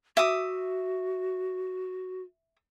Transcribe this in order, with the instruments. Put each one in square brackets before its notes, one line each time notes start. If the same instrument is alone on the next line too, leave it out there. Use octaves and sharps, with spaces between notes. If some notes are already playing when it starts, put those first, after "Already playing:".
[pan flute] F#4 [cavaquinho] E5 D6 D#6